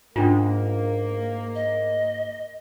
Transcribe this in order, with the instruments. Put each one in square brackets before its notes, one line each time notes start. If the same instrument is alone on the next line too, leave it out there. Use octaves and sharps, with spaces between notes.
[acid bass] G#2 [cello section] A#3 [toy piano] C#4 D4 F4
[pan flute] D#5